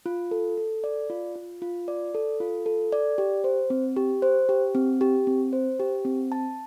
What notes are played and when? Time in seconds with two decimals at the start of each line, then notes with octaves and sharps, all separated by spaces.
0.06 F4
0.31 A4
0.57 A4
0.84 D5
1.10 F4
1.35 F4
1.62 F4
1.88 D5
2.15 A4
2.40 F4
2.66 A4
2.92 D5
3.18 G4
3.44 C5
3.70 C4
3.96 G4
4.22 C5
4.49 G4
4.75 C4
5.01 G4
5.27 C4
5.53 C5
5.80 G4
6.05 C4
6.32 A5